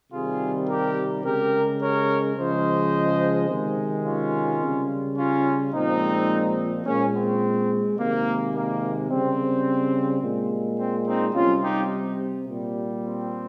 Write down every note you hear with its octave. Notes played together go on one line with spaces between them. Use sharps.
C3 D#3 G3 F4 G#4
G4 A#4
C#3 G#3 G4 A#4
A#4 C#5
C#3 F3 G#3 C5 D#5
C3 D#3 G#3
C#4 F4
C#3 G3
C#4 F4
A#2 F3 G#3 C4 D#4
A#2 G#3 A#3 C#4
C4
C3 D#3 G#3 A#3
A#3
C#3 G3 C4
A#2 G#3
C4
C4 D#4
C3 G3 C#4 F4
D#4 G4
A#2 G3
C4